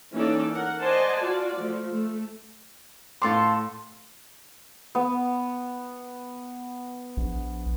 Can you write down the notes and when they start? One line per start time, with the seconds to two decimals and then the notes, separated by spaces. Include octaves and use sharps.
0.13 E3 A#3 C#4 D#4 A4 D5
0.53 A#4 F#5
0.82 C5 D5 D#5 F#5 G#5 A5
1.22 F4 F#4 D5
1.60 F3 A3
1.93 A3
3.22 A2 F4 A4 C6 D6
4.95 B3
7.17 A#1